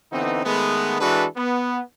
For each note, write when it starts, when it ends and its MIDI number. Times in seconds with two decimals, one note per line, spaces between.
0.12 0.45 50
0.12 0.45 52
0.12 0.45 59
0.12 0.45 60
0.12 0.45 63
0.45 1.00 51
0.45 1.00 56
0.45 1.00 57
0.45 1.00 59
1.01 1.25 52
1.01 1.25 56
1.01 1.25 62
1.01 1.25 66
1.01 1.25 69
1.01 1.25 71
1.36 1.80 59